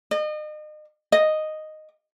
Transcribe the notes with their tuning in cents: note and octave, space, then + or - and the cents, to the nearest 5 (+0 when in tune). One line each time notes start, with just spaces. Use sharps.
D#5 -35
D#5 -5